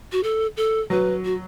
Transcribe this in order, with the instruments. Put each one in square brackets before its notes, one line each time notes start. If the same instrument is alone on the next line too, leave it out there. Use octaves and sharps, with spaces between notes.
[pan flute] F#4
A4
A4
[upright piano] F#3 [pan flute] B4
[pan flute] F#4